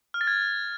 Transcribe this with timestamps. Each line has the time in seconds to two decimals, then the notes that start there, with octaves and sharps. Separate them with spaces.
0.14 F6
0.21 A6
0.27 G#6